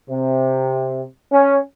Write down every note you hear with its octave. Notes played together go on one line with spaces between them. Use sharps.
C3
C#4